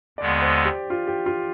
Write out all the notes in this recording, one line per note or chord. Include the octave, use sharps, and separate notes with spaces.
D#2 D3 G#3 B3 D5
C5
G4
F4
G4
F4